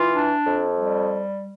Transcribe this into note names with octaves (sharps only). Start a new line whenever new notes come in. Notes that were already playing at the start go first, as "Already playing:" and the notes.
Already playing: E3 F4
D4
F2
G3